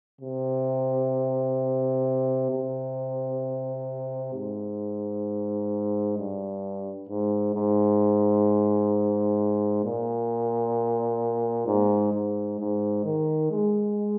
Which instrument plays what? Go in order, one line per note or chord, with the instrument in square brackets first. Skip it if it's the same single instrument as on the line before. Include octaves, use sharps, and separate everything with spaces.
[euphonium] C3
C3
G#2
G2
G#2
G#2
A#2
G#2
G#2
G#2
D#3
G#3